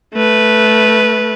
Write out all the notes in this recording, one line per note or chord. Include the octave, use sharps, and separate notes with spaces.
A3 B4